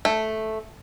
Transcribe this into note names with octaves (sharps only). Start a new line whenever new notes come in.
A3